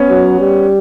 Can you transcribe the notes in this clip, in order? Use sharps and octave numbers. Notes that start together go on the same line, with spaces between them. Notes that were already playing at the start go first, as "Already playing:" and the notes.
Already playing: B3 C#4
F#3
G3